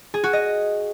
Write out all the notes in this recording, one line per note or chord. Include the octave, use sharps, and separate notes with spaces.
G#4
F#4
D#5